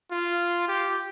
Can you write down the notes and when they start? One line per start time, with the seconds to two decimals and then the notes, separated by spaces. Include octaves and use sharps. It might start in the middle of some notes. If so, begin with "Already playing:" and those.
0.11 F4
0.68 G4